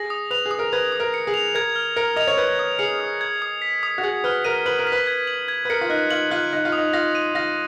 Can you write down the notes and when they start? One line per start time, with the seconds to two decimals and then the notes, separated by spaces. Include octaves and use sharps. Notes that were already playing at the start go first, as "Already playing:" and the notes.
Already playing: G#4 A#6
0.10 D#6
0.31 B4 F7
0.46 G#4
0.51 D#6
0.59 A#4
0.73 B4 G#6
0.92 D#6
1.00 A#4
1.14 C#7
1.27 G#4
1.34 F7
1.55 A#4 G#6
1.76 F6
1.96 A#4 C#7
2.16 D#5 F7
2.28 C#5
2.37 B4 G#6
2.59 D#6
2.79 G#4 C#7
3.00 D#6
3.21 G#6
3.42 D#6
3.62 B6
3.83 D#6
3.98 F#4
4.03 G#4 G#6
4.24 B4 F6
4.45 A#4 D#7
4.66 B4 F#7
4.79 A#4
4.87 B6
4.92 B4
5.07 G#6
5.27 F#7
5.48 G#6
5.65 B4
5.70 A#4 C#7
5.81 F4
5.90 D#4 F#6
6.11 F4 F#7
6.31 F4 F#6
6.52 D#4 F#6
6.65 F4
6.72 D#6
6.78 D#4
6.93 F4 A#6
7.15 D#7
7.35 F4 A#6